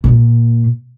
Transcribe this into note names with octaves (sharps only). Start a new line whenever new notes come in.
A#2